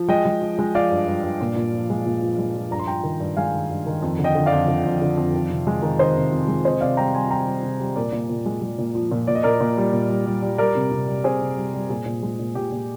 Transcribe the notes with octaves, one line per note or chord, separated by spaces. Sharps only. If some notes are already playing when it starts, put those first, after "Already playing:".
Already playing: F3
G#3 D#5 G5
G#3
F3
G#3
F3 D5 F5
G2
G2
G2
A#2
A#2
F3
G#3
A#2
F3
G#3
F3
G2 A#5
C6
G2 G5 A#5
D#3
G2
G#3 F5 G#5
D#3
G2
D#3
F2
D3
D#5 G5
D3
D5 F5
F2
D3
F2
D3
F2
D#3
C3
G#3
D#3
D#3 C5 D#5
C3
C3
G#3
C3 C5 D#5
C3 D5 F5
G3 G5 A#5
G3 G#5 C6
G3 G5 A#5
G3
C3
G3
A#2 A#4 D5
A#2
A#2
G#3
G#3
A#2
F3
A#2
A#2 D5
D#5
A#2 A#4 D5
A#2
G3
A#2
G3
G3
G3
G3 A#4 D5
C3
C3
G3
C3 G#4 C5
C3
G3
G3
A#2 G#4
A#2
G#3
A#2
A#2 G4
A#2